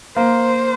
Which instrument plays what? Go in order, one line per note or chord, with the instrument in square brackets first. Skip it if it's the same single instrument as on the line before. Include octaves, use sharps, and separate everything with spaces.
[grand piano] A#3 [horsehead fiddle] C5